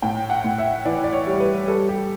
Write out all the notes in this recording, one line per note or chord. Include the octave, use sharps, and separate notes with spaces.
A2 G5
F#5
A2
E5
E3 D5
D5
C#5
G3
B4
G3 A4
G4